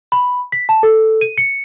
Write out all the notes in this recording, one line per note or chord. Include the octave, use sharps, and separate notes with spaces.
B5
B6
A5
A4
D#7
C#7